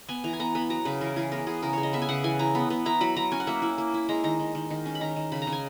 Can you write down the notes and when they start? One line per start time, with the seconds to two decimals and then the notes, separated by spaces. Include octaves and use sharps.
0.09 B3 G#5
0.24 E3 A#5
0.33 G#5
0.40 B3 A#5
0.55 B3 B5
0.70 F#3 A#5
0.85 C#3 B4
1.01 E3 A#4
1.16 E3 G#4
1.32 B3 A#4
1.47 B3 G#4
1.62 C#3 A#4
1.73 C#3 C#5
1.83 D#5
1.93 B3 E5
2.02 G#5
2.09 C#3 F#5
2.24 E3 G#5
2.39 E4 A#5
2.55 B3
2.70 B3
2.86 E4 A#5
3.01 F#3 B5
3.17 F#3 A#5
3.32 C#4 G#5
3.40 F#5
3.47 A#3 E5
3.62 E4
3.78 A#3
3.94 E4
4.09 G#3 A#5
4.24 D#3 A#5
4.39 D#3
4.55 D#3
4.70 D#3
4.86 C#4
4.95 B5
5.01 D#3 A#5
5.16 D#3
5.32 C#3 B5
5.42 A#5
5.47 C#3
5.52 G#5